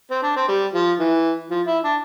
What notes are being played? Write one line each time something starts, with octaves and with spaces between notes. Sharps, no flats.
C4
D4
C4
G3
F3
E3
F3
E4
D4